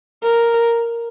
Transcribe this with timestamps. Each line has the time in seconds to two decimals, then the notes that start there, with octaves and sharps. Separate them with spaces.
0.23 A#4